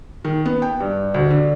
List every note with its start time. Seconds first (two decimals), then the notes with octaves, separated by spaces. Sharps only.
0.25 D#3
0.45 B3
0.62 G5
0.80 G2
1.14 D2
1.30 D3